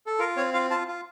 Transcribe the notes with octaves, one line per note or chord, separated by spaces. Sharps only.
A4
F4 A#4
C4 C#5
F4 F5
F4 A5
F4